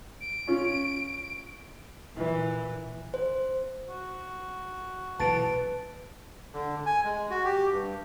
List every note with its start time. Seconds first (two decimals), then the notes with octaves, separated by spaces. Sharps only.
0.21 D7
0.47 C#4 F4
2.15 A#2 E3
3.14 C5
3.89 F#4
5.19 B1 A#2 E3 B4 A5 A6 D7
6.53 D3
6.86 G#5
7.05 G#3
7.30 F#4
7.45 G4
7.72 G2